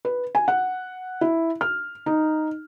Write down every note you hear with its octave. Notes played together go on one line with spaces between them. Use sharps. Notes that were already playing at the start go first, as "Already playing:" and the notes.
B4
G#5
F#5
E4
F6
D#4